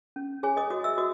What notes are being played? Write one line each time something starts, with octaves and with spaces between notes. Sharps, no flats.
C#4
G#4 C#5 G#5
D#5 D#6
F#4 D#5 D#6
E5 E6
F#4 D#5 D#6